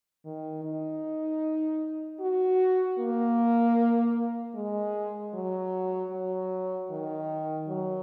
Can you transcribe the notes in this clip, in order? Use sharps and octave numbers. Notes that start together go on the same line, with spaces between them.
D#3
D#4
F#4
A#3
G#3
F#3
F#3
D#3
F#3